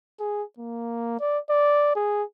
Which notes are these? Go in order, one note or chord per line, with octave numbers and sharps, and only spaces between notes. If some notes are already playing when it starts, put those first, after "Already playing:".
G#4
A#3
D5
D5
G#4